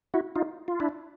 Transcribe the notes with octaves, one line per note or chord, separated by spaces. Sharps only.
E4 F#4
D#4 F4
F4
D4 E4